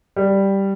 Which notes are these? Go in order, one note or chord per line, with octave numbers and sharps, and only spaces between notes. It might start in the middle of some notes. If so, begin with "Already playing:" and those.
G3